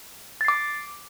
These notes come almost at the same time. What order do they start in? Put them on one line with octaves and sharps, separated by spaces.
A6 C7 D6